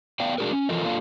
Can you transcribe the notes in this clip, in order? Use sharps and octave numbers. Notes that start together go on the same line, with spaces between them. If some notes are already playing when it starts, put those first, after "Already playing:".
B3 D5 F5 G5
G#3 D4 F#4 G#4 A#4
C#4
E3 F3 F4 A4 A#4 D#5
A#3 D4 F4 A4 F5